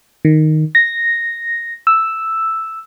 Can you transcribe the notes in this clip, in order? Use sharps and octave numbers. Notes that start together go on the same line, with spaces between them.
D#3
A#6
E6